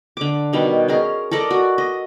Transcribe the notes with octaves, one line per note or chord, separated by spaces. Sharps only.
D3 D6
B2 D#3 G3
C#4 G#4 A#4
A4 A#4 D5 D#5
F#4
D#5